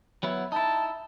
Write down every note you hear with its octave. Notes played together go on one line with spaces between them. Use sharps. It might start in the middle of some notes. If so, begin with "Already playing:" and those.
F#3 B3 E4
D#4 E4 A5